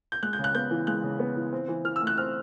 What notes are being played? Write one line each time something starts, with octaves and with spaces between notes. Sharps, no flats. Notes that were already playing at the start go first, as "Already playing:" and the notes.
G6
G#3 F#6
G6
C#3
F#6
B3 G6
E3
G#3 F#6
C#3
B3
E3
C4
E3
E3 F6
E6
A3
F#6
C4 F6